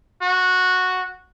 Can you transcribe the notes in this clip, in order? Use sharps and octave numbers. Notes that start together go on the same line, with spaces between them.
F#4